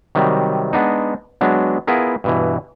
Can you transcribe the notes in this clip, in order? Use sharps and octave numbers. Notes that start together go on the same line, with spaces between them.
C3 D#3 F#3 G3
G#3 B3 D4 D#4
F#3 G#3 B3 D4
B3 E4 F4 G#4 A#4
G2 B2 E3